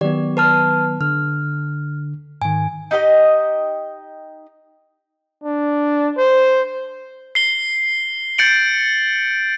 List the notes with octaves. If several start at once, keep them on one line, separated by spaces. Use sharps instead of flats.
D#3 F#3 B3 G4 D5
B4 A5 F6
D3 F6
G#2 D#3 G#5
D#4 G4 A4 D#5
D4
C5
C7 G7
G6 A6 C#7 D7 F#7